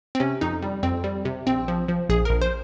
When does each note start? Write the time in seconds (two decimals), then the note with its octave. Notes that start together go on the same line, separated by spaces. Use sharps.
0.15 C4
0.20 C3 C#4
0.41 F2 D#4
0.62 G3
0.83 F2 C4
1.04 G3
1.25 C3
1.46 A#1 C4
1.68 F3
1.88 F3
2.09 A#1 G#4
2.25 A#1 A#4
2.41 C5